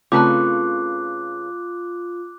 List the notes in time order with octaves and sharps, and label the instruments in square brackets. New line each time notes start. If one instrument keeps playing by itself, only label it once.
[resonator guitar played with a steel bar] C#3 A4 B4 [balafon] A3 C4 [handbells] F4 [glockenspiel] D6 F#6